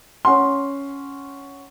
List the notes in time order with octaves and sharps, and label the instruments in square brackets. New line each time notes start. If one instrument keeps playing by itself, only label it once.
[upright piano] C#4 F#5 C6